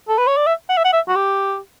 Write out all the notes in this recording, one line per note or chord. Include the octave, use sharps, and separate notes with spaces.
A4
B4
C#5
D5
E5
F#5
E5
F#5
E5
F#4
G4